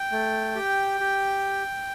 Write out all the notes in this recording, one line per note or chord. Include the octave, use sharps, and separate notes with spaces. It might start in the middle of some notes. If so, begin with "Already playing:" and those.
Already playing: G5
A3
G4
G4